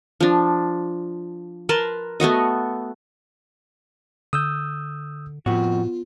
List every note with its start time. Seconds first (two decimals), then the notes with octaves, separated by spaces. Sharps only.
0.20 F3 D4
1.69 A#4 B4 A5 C6
2.20 A3 B3 F#4 D#5
4.33 D3 D#6 E6 G6
5.46 F2 A2 B3 F4 F#4